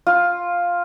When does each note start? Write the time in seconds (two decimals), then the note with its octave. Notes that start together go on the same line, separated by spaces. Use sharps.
0.07 F4